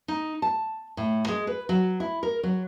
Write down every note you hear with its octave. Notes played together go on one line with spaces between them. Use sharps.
D#4
A5
A2
G#3
B4
F#3
E4
A#4
F#3